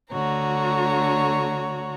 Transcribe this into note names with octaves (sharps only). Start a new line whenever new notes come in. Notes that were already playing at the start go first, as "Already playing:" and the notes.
D2 D3 F#4 C#5 A#5